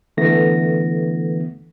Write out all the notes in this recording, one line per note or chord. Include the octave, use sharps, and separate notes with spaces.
D3 E3 A3 B3 A#6